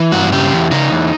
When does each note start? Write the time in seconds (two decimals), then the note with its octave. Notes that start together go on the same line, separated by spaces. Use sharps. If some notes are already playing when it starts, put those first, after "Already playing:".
Already playing: E3
0.12 G2 F#4
0.32 C#3 G4
0.52 E2
0.71 C#3 D#4
0.92 E2